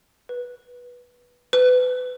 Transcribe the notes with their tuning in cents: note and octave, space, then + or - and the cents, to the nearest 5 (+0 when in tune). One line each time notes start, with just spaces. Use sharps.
B4 -15
B4 +30